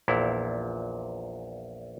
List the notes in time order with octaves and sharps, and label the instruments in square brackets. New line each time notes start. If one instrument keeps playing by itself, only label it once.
[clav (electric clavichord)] A#1 E2 A#2 E4